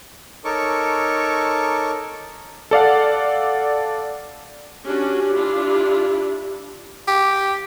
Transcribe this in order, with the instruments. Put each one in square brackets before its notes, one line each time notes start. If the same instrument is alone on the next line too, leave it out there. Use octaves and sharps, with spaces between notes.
[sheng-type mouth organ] D#4 A4 A#4 C#5 C#6 D6
[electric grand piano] A4 D5 F5 F#5
[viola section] C#4 D4 F#4 [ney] G4
[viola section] D4 E4 F4
[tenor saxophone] G4